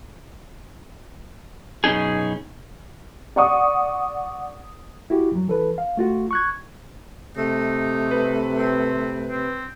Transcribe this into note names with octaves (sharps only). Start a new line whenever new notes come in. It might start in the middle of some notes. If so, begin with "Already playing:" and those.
F#2 B2 C#4 D#4 G#4
D5 F#5 C#6 D#6
E4 F#4 G4
F#2 F#3
E3 A4 B4
F5
A3 F4 F#4
C#6 F#6 G#6
C3 A3 D#4
B4
C4
C4